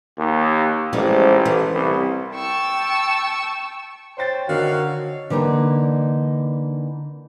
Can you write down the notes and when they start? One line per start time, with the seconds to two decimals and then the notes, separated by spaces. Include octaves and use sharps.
0.18 D#2
0.93 A1 F3 G3 G#3
1.46 E3
1.74 C2
2.35 G5 A5 C#6 E6
4.18 C5 C#5 G5 A6
4.49 D3 D#3 F#4 F5
5.30 D3 E3 A#3 D4 D#4